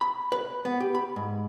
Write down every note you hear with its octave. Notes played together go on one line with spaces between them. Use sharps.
B5
B4
B3
G4
B5
G#2